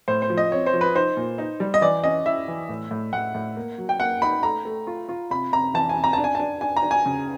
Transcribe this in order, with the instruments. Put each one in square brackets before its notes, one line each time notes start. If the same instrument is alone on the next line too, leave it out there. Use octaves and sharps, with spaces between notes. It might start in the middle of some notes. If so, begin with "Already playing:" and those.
[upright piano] A2 [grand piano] C5
[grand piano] C5
[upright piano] F3
[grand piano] D#5
[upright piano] C4 [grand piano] C#5
[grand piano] C5
[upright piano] F3
[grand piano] B4
[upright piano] D#4 [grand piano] C5
[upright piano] A#2
D#4
G3
[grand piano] D#5
[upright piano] E3 [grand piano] D5
[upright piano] C#4 [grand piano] D#5
[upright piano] E4 [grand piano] E5
[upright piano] E3
A2
A2
[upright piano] A2 [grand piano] F#5
[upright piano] A2
A#3
F#3
[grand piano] G5
[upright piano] A#3 [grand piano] F#5
[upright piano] D#4 [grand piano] B5
[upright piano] A3 [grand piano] A#5
[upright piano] A3
F4
F4
[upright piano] C3 [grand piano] B5
[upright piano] C3 [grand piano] A#5
[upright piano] E3 [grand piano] A5
[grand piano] G#5
[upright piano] C3
[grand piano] A#5
[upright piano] D4 [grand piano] A5
[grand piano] G#5
[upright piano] D4 [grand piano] A5
[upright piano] D4 [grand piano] G#5
[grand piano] A#5
[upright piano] D4
[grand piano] G#5
[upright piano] C#3